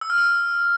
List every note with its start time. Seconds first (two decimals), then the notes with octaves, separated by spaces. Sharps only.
0.01 E6
0.10 F6
0.18 E6